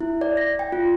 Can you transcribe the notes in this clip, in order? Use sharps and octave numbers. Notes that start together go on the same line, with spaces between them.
E4
D5
A#6
G5
F4